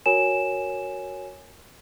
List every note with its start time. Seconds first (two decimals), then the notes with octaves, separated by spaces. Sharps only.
0.06 F#4 A#4 C#5 G#5 E7